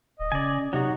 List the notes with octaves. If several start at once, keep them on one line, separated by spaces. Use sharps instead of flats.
D1 D#5
C#3 C#4 D5 G#5
C3 F#3 B3 D#4 F#4 G4